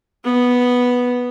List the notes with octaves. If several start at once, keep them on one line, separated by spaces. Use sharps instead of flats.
B3